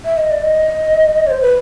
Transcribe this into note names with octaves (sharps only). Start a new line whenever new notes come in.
E5
D#5
D5
D#5
C#5
C5
B4